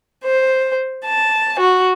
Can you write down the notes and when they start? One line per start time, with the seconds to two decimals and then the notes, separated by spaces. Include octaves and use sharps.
0.24 C5
1.07 A5
1.61 F#4